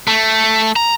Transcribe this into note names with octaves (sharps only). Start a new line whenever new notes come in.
A3
A#5